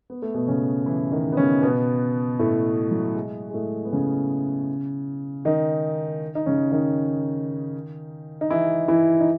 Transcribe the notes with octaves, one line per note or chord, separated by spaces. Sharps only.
B3
A3
B2 B3
C#3 C#4
E3 E4
D#3 D#4
B3
C#3 C#4
B2 B3
A2 A3
F#3
G#3
G#3
A2 A3
B3
C#3 C#4
D#3 D#4
D#4
C#3 C#4
D#3 D#4
D#4
E3 E4
E3 E4
D#4